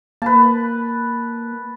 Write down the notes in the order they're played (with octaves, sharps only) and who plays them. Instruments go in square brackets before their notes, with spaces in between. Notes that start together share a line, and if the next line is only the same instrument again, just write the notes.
[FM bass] A#3 [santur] B4 A5